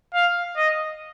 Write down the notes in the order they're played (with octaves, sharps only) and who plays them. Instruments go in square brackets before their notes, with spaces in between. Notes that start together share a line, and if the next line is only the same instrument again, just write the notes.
[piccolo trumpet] F5
D#5